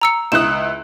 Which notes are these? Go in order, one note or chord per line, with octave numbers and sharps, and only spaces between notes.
A#5 E6 C#7
C#2 E4 D#6 F#6 E7